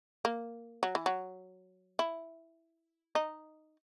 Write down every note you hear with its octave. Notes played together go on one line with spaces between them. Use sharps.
A#3
F#3
E3
F#3
E4
D#4